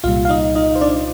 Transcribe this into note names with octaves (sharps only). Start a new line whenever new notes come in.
C2 A#2 G3 F4 F5
F5
D#4 D#5
D#4 D#5
C5
D4 D5